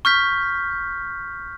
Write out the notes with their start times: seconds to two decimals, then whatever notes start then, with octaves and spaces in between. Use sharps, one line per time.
0.05 C#6 F6 G6 B6